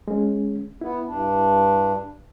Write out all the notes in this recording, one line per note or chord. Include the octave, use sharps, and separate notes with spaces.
G#3 C#4
B3 E4
G2 D4